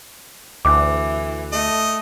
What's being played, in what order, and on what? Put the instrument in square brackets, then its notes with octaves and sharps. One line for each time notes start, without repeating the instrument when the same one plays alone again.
[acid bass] D2 [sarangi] E3 [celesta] D6
[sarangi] A3 [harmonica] D#5